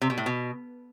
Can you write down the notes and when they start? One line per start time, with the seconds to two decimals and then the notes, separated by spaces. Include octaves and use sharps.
0.01 C3
0.10 B2
0.17 A2
0.26 B2